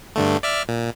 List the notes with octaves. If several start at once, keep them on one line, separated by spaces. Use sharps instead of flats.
G2 D3 A3
D5 E5 F6
A#2